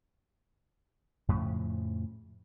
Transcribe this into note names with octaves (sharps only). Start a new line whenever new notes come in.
F2 A2 C#3 F3